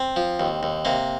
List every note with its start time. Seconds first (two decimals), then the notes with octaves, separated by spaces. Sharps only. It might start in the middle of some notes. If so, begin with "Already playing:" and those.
Already playing: C4
0.16 F3
0.40 D#2
0.63 D#2
0.85 C3 A#3